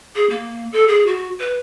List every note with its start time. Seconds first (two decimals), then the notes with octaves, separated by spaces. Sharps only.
0.16 G#4
0.30 A#3
0.72 A4
0.88 G#4
1.07 F#4
1.40 B4